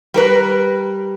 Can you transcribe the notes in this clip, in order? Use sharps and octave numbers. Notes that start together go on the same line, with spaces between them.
G3 A#4 B4